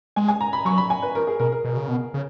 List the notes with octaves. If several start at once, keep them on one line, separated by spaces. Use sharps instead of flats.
G#3 G#5
G#5
A#5
B5
F#3 C#6
B5
G#5
B4
F3 A#4
G#4
B2 A#4
A#4
B2
C#3
B2
C#3